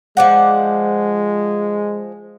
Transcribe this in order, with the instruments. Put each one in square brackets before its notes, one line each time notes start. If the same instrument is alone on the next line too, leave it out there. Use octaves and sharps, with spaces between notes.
[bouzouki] F3 D5 F#5 [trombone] G#3